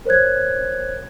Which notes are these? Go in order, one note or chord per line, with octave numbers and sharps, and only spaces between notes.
A#4 C5 C#5 F#6 G#6